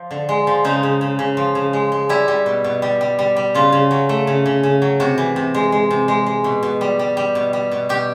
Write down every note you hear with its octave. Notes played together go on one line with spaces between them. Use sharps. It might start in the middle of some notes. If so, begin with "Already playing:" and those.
Already playing: F3
D3
G#3
F3
C#3 D#4
C#3
C#3
C#3
F3
C#3
G#3
G#3
G3 E4
G3
B2
B2
G3
G3
G3
G3
C#3 F4
C#3
F#3
A3
C#3
C#3
C#3
F#3
C3 F#4
E3
C3
G#3
G#3
C3
G#3
G#3
B2
B2
G3
G3
G3
B2
G3
B2
B2 G4